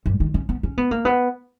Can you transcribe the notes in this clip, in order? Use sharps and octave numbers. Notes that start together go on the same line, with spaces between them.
G2
D#3
C#4
B3
C#4
B3
A#3
B3